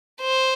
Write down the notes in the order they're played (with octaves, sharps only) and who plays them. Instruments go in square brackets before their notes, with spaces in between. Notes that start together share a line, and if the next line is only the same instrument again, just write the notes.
[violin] C5